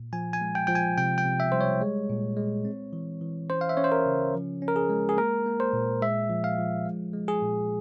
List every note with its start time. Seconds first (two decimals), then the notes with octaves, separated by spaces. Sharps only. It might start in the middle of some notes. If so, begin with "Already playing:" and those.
Already playing: A#2
0.13 F3 G#5
0.33 G#5
0.41 G#3
0.55 G5
0.67 F3 G5
0.75 G#5
0.98 C3 G5
1.18 G5
1.25 C3
1.40 E5
1.52 G3 C5
1.61 C#5
1.81 G#3
2.10 A#2
2.37 G#3
2.65 C4
2.93 E3
3.21 E3
3.50 C#4 C5
3.61 F5
3.69 E5
3.77 C#4 C#5
3.84 C5
3.92 A#4
4.06 C#3
4.34 F3
4.62 C#4
4.68 A#4
4.76 G#4
4.90 G#3
5.09 G#4
5.17 A#3 A#4
5.46 A#3
5.60 C5
5.73 A#2
6.02 G#3 E5
6.29 F3
6.44 F5
6.58 F3
6.85 G#3
7.13 G#3
7.28 G#4
7.42 A#2